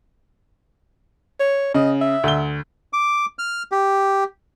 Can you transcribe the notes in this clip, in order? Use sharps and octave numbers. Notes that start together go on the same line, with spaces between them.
C#5
C#3 D#5
E5
D2 G7
D6
F6
G4